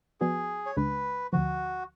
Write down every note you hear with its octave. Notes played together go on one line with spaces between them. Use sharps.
F3 B3 F#4 G#4 B4 D5
C#5
C#2 C#3 G#3 D4 B4
D2 D3 F3 F#4